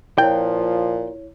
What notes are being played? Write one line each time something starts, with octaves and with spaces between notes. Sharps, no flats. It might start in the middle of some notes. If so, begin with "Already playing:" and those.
A#2 F3 E4 C#5 G5